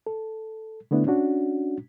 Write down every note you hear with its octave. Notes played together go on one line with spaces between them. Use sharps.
A4
D3 A3 B3 D4 E4
C#4 D4 F#4